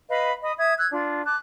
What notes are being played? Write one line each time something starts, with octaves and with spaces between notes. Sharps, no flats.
B4 D#5 F5 B5
D#5 B5 D#6
E5 D#6 G#6
E6 F#6 G#6
D4 F4
A5 D6 F#6